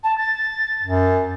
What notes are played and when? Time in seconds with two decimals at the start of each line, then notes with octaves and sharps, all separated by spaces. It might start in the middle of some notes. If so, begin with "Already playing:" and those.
0.03 A5
0.18 A6
0.83 F#2